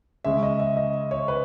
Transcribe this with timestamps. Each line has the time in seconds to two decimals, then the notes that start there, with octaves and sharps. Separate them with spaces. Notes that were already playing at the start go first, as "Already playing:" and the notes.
0.25 C#3 G#3 C#4 E5
0.43 D#5
0.59 E5
0.77 D#5
1.11 C#5
1.28 B4